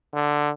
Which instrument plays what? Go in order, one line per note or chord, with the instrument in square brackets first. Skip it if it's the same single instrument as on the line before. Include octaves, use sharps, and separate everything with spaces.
[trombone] D3